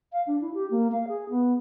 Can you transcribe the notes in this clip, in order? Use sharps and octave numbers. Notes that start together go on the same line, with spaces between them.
F5
D4
E4
G4
A#3
F5
G#4
B3